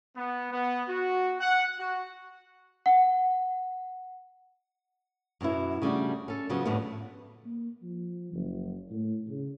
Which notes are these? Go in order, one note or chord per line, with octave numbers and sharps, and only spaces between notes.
B3
B3
F#4
F#5
F#4
F#5
F#2 B2 F#3 E4
C#3 G3 A3 D4 F#4
C#4 A4
C#3 F3 F#3 B3
F2 A2 D3 G3 B3
A#3
F3
F#1
A2
C#3